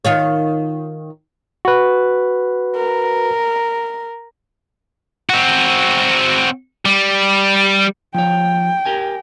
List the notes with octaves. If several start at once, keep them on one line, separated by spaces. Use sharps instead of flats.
D#3 F4 C#5
F#4 B4
A#4
C4 F#4
G3
F3 C#5 G5
G4 A#4 G#5